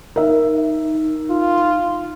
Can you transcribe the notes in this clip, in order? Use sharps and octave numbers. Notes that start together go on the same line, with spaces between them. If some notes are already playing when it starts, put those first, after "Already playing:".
D#4 A#4 E5
F4